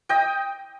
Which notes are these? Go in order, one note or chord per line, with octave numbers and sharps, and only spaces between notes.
D#5 G5